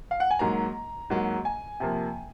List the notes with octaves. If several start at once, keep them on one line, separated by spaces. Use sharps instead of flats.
F5
F#5
G#5
G#2 F#3 A#3 A#5
G#2 F#3 A#3
G#5
C3 F3 A#3